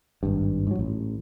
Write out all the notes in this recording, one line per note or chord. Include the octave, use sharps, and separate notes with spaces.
G#1 G2
G#2 F#3
A1